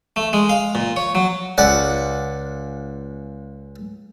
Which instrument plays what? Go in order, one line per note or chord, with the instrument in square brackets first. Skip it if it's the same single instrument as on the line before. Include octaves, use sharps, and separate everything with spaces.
[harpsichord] A3
G#3
F5
A#2
C#5
F#3
C#2 D5 F#5